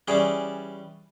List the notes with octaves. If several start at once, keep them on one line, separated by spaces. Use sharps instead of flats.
E3 G3 C#4 G#4 D5